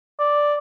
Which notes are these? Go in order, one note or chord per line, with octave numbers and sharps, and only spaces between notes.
D5